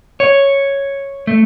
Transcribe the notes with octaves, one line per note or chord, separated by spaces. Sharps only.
C#5
A3